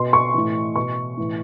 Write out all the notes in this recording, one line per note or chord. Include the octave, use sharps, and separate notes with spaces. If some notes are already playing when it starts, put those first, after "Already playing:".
Already playing: B2 C6
C#6
A2 E3
B2 C#6
A2 E3